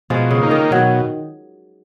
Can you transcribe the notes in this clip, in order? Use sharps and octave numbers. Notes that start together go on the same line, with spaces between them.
B2 F3 G#3
C#3
A#3 D#4
D#3
B2 F#3